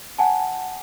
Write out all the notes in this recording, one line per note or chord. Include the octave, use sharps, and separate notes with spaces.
F#5 G#5 A5